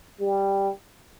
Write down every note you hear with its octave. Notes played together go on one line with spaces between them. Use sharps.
G3